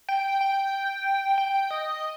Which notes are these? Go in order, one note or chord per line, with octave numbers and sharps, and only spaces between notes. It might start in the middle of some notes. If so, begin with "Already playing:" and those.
G5
G5
G5
D#5